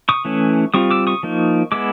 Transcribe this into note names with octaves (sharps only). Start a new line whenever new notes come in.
C#6 D#6
E3 A3 C#4 E4
G3 C4 F4 C#6 D#6
D6 E6
C#6 D#6
F3 A#3 D#4
G#3 B3 E4 D6 E6